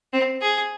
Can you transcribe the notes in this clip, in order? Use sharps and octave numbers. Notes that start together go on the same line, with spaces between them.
C4
G#4